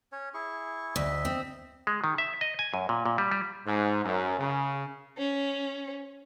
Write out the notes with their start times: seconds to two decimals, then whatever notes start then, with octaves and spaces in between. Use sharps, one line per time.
0.12 C#4 C#5
0.34 E4 G#4 C#6
0.96 D2 D#5 E5
1.25 C4
1.87 G#3
2.04 D#3
2.18 E5
2.41 D#5
2.59 G#5
2.74 F#2
2.89 A#2
3.05 A#2
3.18 G3
3.32 G3
3.67 G#2
4.05 F#2
4.39 C#3
5.17 C#4